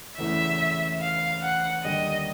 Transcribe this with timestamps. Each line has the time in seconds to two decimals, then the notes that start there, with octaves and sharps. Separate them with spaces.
0.18 E2 C#3 E3 A3 C#4 E5
1.01 F5
1.42 F#5
1.84 D#2 D3 G3 A#3 D#5